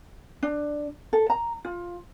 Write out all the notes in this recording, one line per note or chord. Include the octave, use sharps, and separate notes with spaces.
D4
A4
A#5
F4